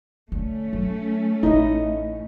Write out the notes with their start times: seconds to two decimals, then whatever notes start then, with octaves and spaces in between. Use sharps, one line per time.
0.32 D3 A3 C#4
0.73 F#3
1.43 A1 D#4 E4 D#5